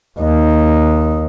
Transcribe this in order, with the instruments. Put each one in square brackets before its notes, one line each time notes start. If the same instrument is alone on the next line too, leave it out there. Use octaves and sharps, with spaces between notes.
[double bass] D#2 D#4